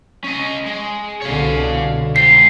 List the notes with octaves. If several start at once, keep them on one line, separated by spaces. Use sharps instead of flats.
C#4 D#5
G#3
C2 B2 D3 C#5 F5
G#2 G4 C7